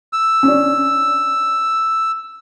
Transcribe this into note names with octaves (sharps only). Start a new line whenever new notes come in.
E6
C#4 D4